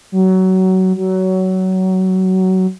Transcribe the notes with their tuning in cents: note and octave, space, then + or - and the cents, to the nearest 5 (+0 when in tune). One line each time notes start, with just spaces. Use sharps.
F#3 +20
F#3 +20